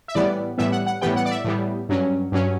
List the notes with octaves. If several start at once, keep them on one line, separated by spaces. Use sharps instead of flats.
E5
A2 E3 G3 B3 D5
A2 E3 G3 B3 E5
F#5
F#5
A2 E3 G3 B3 G5
F#5
D5
E5
A2 E3 G3 B3
G2 F#3 C#4
G2 F#3 C#4